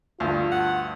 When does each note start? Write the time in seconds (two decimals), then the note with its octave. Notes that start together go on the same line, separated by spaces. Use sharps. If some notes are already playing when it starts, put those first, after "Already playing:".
0.20 D2 G2 F4
0.51 F#5